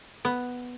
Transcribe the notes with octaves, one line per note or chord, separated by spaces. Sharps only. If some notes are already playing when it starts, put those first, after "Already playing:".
B3